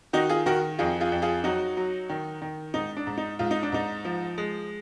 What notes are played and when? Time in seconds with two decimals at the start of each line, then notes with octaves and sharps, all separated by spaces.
0.13 D#3 D#4 F#4
0.29 F4 G#4
0.46 D#3 F#4 A#4
0.79 F2 F4 G#4
1.00 F4 G#4
1.12 F2
1.22 F4 G#4
1.44 F#3 D#4 F#4
1.77 F#3
2.09 D#3
2.42 D#3
2.74 G#2 D#4
2.97 D4
3.07 G#2
3.18 D#4
3.39 G#2 F4
3.51 D#4
3.63 D4
3.72 G#2 D#4
4.05 F3
4.38 G#3